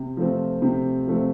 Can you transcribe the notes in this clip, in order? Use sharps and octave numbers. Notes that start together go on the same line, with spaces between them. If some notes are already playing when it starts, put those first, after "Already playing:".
Already playing: C3
F3 A3 C4
C3
F3 A3 C4